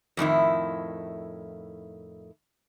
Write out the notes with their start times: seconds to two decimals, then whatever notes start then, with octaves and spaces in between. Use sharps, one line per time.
0.17 F2 A2 D#3 E4